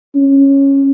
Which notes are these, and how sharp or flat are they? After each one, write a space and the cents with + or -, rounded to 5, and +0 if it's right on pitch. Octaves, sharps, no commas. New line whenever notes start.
C#4 -10